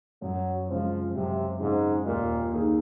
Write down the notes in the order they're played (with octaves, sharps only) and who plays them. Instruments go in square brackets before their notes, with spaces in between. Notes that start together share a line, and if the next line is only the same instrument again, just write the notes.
[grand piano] F#2 [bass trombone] F#3
[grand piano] C#3 G#3 C4 [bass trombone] F3
[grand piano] F#2 [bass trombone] C3
[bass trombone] G#2 [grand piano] C#3 G#3 C4
[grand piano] D#2 [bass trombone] A#2
[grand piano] D#3 A#3 D#4 G#4